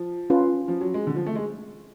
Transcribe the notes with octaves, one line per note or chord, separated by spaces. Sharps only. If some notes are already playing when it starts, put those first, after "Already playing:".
Already playing: F3
C#4 F4 B4
F3
F#3
G#3
D3
F3
A3
G#3